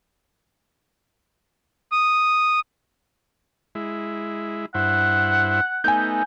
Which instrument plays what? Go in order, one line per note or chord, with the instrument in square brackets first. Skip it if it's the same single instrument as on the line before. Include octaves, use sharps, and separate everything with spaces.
[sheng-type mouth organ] D#6
[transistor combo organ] G#3 E4
[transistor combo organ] G2 E4 C5 [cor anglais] F#5
[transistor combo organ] A3 B3 D#4 [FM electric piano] G#5 G6